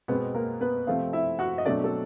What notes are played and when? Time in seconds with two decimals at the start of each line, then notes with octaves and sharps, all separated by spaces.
0.08 B2 G#3 B3 C4 B4
0.34 A#3 A#4
0.61 B3 B4
0.87 C3 F3 A3 C4 F4 F5
1.13 E4 E5
1.39 F#4 F#5
1.58 D#5
1.65 B2 F#3 A3 C4 D4 D5
1.84 A4